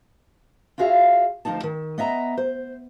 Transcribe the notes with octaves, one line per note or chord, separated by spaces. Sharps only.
F4 F#4 G#4 E5 F5
D2 F3 C4 D#4 A5
D#3
B3 D#5 E5 A#5
C5